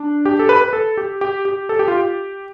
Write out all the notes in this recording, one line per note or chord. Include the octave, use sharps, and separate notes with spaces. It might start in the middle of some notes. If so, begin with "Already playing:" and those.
Already playing: D4
G4
A4
B4
B4
A4
G4
G4
G4
A4
G4
F4
G4